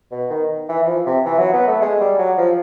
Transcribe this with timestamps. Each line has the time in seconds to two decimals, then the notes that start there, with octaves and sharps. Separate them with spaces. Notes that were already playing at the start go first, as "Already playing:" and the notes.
0.12 B2
0.30 D#3
0.69 E3
0.83 E3
0.87 F3
1.06 C3
1.26 E3
1.39 F#3
1.53 B3
1.68 A3
1.82 G#3
2.01 G3
2.19 F#3
2.38 F3